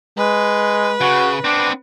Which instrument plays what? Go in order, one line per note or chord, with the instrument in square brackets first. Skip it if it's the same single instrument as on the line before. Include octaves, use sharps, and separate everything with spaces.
[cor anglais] G#3 [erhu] B4
[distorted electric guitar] C#3 [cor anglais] F#4
[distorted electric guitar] B3 C4 [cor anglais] D4